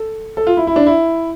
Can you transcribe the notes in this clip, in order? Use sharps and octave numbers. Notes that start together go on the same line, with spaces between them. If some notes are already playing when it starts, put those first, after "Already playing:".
Already playing: A4
A4
F4
E4
E4
D4
E4